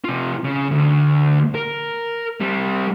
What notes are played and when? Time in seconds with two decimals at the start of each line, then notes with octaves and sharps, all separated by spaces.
0.04 C3 F4
0.44 C#3
0.71 D2
1.55 A#4
2.40 G3 C4